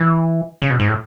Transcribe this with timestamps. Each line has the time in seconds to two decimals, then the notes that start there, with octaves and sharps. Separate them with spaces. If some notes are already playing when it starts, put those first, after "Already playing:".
Already playing: E3
0.62 C#3
0.70 B2
0.80 G#2
0.88 A2